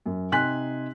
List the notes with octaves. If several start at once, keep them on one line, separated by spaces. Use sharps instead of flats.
F#2
C3 D#4 G#5 C6 F#6 B6